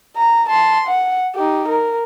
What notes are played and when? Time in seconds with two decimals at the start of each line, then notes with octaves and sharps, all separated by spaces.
0.17 A#5
0.50 A5 C6
0.87 F#5
1.35 D#4 G4
1.68 A#4